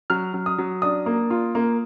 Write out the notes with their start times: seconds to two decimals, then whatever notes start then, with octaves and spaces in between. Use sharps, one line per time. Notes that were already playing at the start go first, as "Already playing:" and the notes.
0.10 F#3 F6
0.34 F#3
0.46 D#6
0.58 F#3
0.82 D4 D#6
1.06 A#3
1.30 F4
1.55 A#3